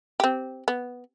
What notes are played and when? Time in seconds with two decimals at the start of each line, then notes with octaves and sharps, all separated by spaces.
0.20 C4 G4
0.68 B3